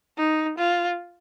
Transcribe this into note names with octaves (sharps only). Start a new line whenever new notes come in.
D#4
F4